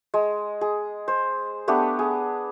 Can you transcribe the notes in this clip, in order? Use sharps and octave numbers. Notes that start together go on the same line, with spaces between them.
G#3
G#4
C5
A3 B3 D4 G4
G#4